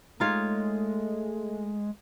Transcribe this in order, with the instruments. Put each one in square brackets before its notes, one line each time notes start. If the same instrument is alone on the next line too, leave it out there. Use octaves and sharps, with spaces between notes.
[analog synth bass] G#3 [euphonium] A3 [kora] D#4 F4 C#5